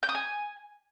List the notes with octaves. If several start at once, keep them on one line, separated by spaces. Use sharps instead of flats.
G6
D#6
G#5